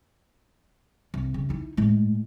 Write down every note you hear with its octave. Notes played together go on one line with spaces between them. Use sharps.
C2
C#3
D#4 E4
A2 G#3